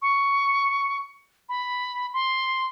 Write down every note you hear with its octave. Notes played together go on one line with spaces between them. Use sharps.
C#6
B5
C6